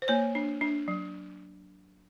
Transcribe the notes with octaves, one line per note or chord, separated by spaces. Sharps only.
C5
A#3 C#5
D4
D4
F#3